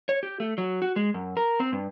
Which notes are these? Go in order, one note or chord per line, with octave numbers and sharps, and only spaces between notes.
C#5
G4
A3
F#3
F#4
G#3
F#2
A#4
C4
G2